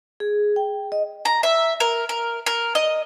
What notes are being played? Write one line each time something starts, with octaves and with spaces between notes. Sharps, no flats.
G#4
G5
D#5
A#5
E5
A#4
A#4
A#4
D#5